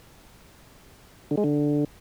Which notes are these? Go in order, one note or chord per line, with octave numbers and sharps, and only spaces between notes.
D3
G#3
D3